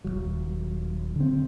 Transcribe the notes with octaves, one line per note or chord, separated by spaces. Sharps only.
D#1 D#2 F#3
D3 C4